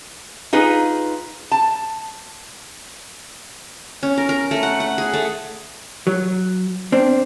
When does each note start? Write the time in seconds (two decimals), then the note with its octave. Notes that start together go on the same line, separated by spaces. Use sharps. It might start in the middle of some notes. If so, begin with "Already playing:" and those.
0.53 D#4 F4 G#4 B4
1.51 A5
4.03 C#4
4.18 A#4
4.29 A#4
4.51 A3
4.63 F#5
4.80 F#5
4.98 G#4
5.14 A3
6.07 F#3
6.92 C4 D4